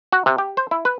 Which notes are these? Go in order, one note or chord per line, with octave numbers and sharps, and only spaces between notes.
F#4
C3
G4
C5
E4
B4